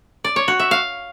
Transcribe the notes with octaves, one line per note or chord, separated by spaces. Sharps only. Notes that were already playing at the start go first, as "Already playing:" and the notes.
D5
C#5
F#4
E5
F5